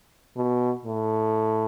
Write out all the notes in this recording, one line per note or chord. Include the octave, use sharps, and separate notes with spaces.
B2
A2